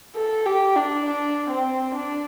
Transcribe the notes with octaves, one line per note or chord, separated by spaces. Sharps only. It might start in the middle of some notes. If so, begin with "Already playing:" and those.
A4
G4
D4
D4
C4
D4